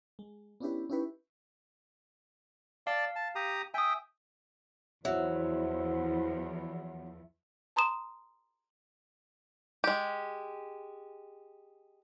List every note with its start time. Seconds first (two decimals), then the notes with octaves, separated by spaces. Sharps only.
0.19 G#3
0.60 B3 C#4 D4 E4 G4 B4
0.90 C#4 D#4 E4 G4 B4 C#5
2.87 D5 F5 A5
3.16 A5
3.35 G4 A#5 D#6
3.74 E5 G5 G#5 D#6
5.05 E2 F3 F#3 E4 C5 E5
7.76 A5 A#5 C6 D#6 E7
9.84 G#3 G4